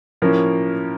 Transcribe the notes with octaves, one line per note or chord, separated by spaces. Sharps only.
A2 F3 A#3 C#4 A#4